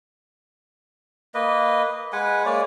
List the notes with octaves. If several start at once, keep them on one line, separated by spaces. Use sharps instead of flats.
A#3 B4 D#5
G#3 B4 F#5 G#5
G#3 A#3 C#5 D5